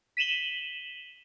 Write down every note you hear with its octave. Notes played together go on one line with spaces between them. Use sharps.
B6 D#7 E7 F#7 G7